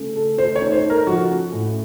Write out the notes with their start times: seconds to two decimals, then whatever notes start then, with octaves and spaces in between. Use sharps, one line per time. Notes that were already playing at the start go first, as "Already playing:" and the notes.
Already playing: C#3 A3
0.16 A4
0.38 A3 C5
0.56 C#5
0.61 D#4
0.72 C5
0.84 A4
0.90 A#4
1.07 F3 F#4
1.30 C#4
1.53 A2